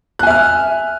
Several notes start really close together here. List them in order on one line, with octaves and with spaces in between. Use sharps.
F#6 G#5 E5 F6